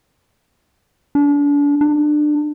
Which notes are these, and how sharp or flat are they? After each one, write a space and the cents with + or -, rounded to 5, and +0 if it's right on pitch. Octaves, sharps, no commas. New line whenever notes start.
D4 -35
D4 +25